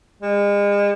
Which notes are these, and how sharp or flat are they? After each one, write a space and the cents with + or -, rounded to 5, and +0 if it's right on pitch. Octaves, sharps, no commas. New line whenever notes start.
G#3 -40